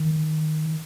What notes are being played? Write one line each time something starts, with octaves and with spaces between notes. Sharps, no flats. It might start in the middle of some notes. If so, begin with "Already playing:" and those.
Already playing: D#3